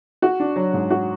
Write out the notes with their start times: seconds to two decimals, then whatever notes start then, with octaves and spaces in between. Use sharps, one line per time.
0.22 F#4
0.40 D4
0.56 F#3
0.73 G#2
0.90 F#4